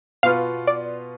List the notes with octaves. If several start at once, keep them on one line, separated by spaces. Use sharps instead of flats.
B2 B3 F4 B4 F5
D5